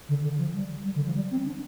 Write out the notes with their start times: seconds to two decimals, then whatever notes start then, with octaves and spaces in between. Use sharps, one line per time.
0.08 D3
0.23 D3
0.38 F3
0.53 G3
0.85 G3
0.95 D3
1.05 F3
1.15 G3
1.30 C4
1.45 D4